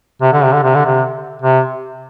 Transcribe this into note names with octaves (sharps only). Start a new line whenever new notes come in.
C3
D3
C3
D3
C3
D3
C3
C3